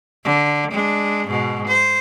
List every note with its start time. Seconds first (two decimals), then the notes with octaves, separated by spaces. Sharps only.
0.24 D3
0.72 G#3 D4
1.27 G#2 B2
1.67 C5